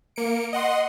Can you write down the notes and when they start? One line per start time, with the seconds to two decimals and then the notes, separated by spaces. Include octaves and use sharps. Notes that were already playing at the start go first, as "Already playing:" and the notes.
0.16 A#3 C#7 D7
0.53 D#5 F#5 C6